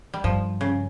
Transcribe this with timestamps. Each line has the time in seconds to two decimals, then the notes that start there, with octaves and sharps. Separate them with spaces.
0.14 G3
0.24 G2 F3
0.61 C#3